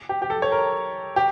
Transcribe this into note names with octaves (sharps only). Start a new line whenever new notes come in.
G4
G4
A4
C#5
A#4
G4